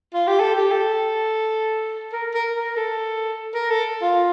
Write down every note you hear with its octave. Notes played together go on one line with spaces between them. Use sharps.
F4
G4
A4
G4
A4
A#4
A#4
A#4
A4
A#4
A4
F4